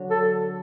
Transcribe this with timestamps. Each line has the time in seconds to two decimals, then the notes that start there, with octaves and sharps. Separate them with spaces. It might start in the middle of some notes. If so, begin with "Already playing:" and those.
Already playing: D3 F#3 D4
0.10 A4